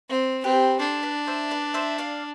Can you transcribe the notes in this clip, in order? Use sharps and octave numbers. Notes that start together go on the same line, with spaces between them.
C4
C4 G4 B4
D4 A4 C5
B4 D5
C5 E5
B4 D5
C5 E5
D5 F5